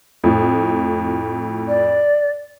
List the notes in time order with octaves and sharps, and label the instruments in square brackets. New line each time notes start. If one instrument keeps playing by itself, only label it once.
[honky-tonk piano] F2 A2
[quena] D5